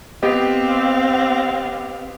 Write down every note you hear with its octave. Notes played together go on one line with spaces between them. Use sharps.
B3 C4 G4 D#5 F5